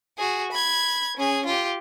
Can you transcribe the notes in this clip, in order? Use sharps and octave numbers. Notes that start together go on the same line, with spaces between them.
F#4 G#4
B5 G#6
C#4 G#4
F4 G4